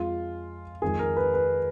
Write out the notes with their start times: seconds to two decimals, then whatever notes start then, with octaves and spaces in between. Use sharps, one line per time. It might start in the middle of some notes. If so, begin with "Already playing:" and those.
Already playing: F2 F3 G#3 F4
0.82 F2 D#3 G#3 G#4
0.99 A#4
1.17 B4
1.34 B4